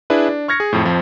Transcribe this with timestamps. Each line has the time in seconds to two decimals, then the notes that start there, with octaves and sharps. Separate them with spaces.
0.10 D4 E4 G#4 B4
0.29 D4
0.48 C#6 F6 G#6 A#6 C#7
0.60 G#4
0.73 F2 A2
0.85 F2 F3